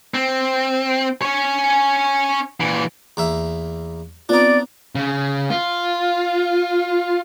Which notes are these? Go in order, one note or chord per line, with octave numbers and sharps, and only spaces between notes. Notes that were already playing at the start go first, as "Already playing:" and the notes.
C4
C#4 C#5
A#2 E3
E2 A#3 E5
B3 C4 D4 D#4 F4 D5
C#3
F4